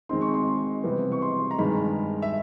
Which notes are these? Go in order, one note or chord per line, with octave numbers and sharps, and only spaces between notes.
D#3 G#3 C4 D#4 C6
C#6
C6
C3 E3 G3 B3
C#6
C6
A#5
G2 D#3 G#3 B5
E5